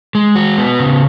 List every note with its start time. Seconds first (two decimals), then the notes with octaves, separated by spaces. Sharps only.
0.15 G#3
0.36 F#4
0.58 B3
0.80 C#3